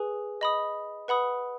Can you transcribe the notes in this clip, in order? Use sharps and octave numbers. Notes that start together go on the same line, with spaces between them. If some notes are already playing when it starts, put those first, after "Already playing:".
Already playing: G#4 B4 G#5 D#6
D#5 B5 D#6
B4 F#5 B5 D#6